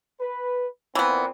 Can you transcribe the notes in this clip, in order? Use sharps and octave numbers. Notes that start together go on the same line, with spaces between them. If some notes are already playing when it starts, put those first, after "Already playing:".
B4
A#2 E3 B3 C4